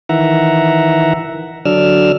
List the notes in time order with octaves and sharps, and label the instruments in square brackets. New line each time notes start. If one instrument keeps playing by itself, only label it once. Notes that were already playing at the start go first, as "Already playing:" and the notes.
[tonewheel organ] D#3 E3 E5 F#5 A#5
D3 F#3 D4 D5 E6 F6